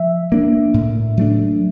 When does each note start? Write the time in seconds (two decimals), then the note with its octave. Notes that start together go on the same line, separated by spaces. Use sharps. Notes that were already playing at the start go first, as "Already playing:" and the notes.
Already playing: F3 E5
0.32 A#3 D4
0.74 A2
1.17 F#3 A3 D4